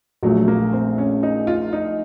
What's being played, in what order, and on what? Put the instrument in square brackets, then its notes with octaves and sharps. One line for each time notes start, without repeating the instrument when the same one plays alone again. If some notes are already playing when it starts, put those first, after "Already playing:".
[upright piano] A#1 A#2 A3 [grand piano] F#3
[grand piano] A#3
C4
C#4
D#4
F4
D#4